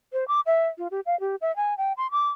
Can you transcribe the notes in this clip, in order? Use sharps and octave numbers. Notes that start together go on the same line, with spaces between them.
C5
D6
E5
F4
G4
F5
G4
E5
G#5
G5
C6
D6